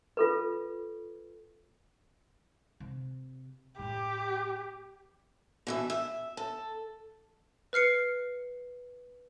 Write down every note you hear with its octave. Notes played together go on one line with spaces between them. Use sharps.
F4 A4 B4
C3
A2 G4
B2 E3 E5
E5
A4
B4 F6 C7 C#7